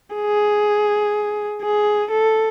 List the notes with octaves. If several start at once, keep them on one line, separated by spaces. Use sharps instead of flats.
G#4
G#4
A4